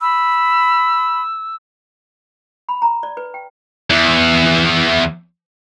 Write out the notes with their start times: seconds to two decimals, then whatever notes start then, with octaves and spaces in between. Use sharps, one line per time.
0.01 B5 E6
2.69 B5
2.82 A#5
3.03 D5
3.17 B4
3.34 G5
3.90 E2 E3